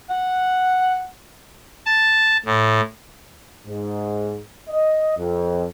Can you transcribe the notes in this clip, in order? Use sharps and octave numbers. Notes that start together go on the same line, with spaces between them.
F#5
A5
A2
G#2
D#5
F2